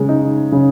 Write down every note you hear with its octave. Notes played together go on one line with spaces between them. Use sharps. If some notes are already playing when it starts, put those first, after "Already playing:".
Already playing: C#3 G#3
D#4
C#3